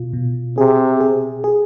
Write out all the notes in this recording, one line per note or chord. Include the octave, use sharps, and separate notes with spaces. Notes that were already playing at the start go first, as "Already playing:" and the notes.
Already playing: B2 F4
B2
C3 G#4
G#4
G#4